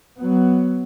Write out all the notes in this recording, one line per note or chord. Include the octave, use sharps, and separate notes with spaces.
F#3 B3